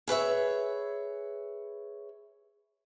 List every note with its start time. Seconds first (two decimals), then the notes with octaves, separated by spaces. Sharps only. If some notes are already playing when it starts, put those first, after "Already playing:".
0.08 G#4 B4 C#5 E5